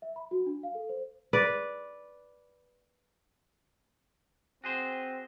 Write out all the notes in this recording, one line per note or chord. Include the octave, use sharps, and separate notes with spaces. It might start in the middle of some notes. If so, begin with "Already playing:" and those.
E5
B5
F#4
D4
F5
A4
C5
B4 D5
C4 F#4 G#4 C5